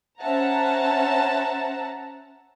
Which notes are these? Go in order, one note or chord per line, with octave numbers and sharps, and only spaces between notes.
C#4 C5 E5 F#5 A5 A#5